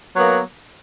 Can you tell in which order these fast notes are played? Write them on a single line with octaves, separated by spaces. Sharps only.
F#3 B3 A#3